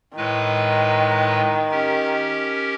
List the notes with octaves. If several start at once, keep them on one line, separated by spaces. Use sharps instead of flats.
A2 D#3 G#3 B4
C#4 G4 A#4